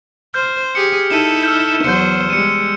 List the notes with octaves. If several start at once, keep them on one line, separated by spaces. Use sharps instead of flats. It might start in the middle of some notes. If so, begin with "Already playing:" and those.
C5 F6 G6
G4 G#4 C#7
D#4 E4 A4 D#7 E7
E6 F6 G6
E2 F#3 C5 G6 C#7
G3 G#3 C#7 D#7